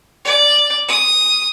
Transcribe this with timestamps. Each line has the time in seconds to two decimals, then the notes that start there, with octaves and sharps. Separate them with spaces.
0.25 D5
0.88 D#6